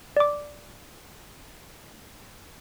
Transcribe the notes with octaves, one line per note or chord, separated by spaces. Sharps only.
D5 D6